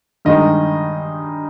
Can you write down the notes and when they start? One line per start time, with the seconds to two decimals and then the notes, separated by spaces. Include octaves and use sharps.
0.25 G2 D#3 G#3 D#4 D#5